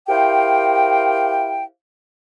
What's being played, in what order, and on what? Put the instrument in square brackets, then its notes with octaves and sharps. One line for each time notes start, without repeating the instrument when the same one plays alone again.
[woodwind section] E4 G4 A#4 C5 F5 G5